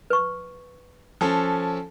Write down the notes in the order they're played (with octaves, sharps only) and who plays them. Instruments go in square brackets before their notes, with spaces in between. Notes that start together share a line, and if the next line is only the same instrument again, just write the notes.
[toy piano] B4 C#6
[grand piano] F3 C#4 A4